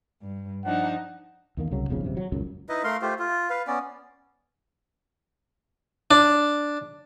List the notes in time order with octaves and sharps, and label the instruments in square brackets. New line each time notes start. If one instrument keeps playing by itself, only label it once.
[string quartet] G2
[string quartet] F3 D4 D#4 [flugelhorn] F#5
[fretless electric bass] E2 D#3 A#3
C2 C#3 F#3
E1 B1 F2 C#3
D#1 C3
F#3
D#1 C#2 F#2
[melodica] D#4 E4 B4 D#5
A3 A#4 F5 C6
A3 F4 G4 C5
F4
B4 F5
B3 C#4 D5
[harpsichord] D4